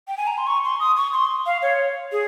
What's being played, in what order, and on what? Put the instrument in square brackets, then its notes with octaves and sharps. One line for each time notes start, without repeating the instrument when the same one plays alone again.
[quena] G5
G#5
A#5
C6
C#6
C6
D#6
C#6
C6
F5
C#5
G#4